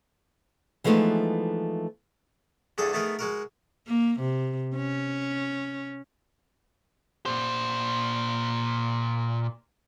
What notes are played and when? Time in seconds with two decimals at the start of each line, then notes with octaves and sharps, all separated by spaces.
0.84 E3 F3 G#3 A3 B3 D#4
2.78 E2 G2 G#4 A4 C#6 D#6
2.93 A3 B3 D#4 G#4 A#4
3.19 G#3 F#4 A#4
3.87 A#3
4.20 C3
4.76 C#4
7.26 A#2 C5